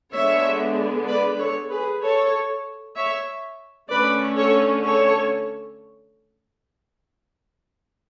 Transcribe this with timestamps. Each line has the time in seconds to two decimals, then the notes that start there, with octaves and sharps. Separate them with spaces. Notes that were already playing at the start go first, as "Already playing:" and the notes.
0.14 D3 G#3 B3 D4 C#5 E5
1.08 B4 D5
1.39 A4 C#5
1.71 G#4 B4
2.02 A4 C#5
2.96 C#5 E5
3.90 D3 A3 C#4 B4 D5
4.37 A4 C#5
4.84 A4 C#5